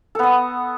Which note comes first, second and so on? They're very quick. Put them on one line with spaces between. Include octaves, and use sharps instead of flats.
A4 B3 D#5